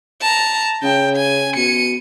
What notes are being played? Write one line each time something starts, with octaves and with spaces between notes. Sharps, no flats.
A5 A#5
C#3 G5
G#5
B2 C#7 D#7